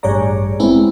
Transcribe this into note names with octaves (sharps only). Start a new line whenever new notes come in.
A1 G2 G#4 C#5 D5 A#5
G#3 B3 C4 E4